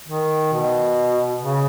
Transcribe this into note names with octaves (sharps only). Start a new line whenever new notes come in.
D#3
B2
C#3